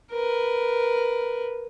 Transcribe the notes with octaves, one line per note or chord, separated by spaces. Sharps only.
A#4 B4